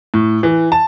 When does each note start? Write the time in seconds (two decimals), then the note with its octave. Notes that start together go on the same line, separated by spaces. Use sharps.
0.14 A2
0.43 E3
0.72 A5